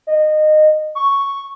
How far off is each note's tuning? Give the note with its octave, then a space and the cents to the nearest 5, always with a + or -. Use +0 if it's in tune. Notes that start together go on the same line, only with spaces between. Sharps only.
D#5 -20
C#6 +0